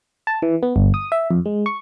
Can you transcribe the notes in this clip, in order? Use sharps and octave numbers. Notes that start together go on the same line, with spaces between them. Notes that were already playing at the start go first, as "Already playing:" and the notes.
A5
E3
B3
G1
D#6
E5
F2
G#3
C#6